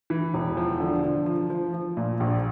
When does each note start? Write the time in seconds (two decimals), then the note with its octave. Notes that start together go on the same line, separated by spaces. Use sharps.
0.10 E3
0.34 E1
0.57 F3
0.80 D3
1.04 F3
1.26 F3
1.50 F3
1.73 F3
1.97 A#2
2.20 A#1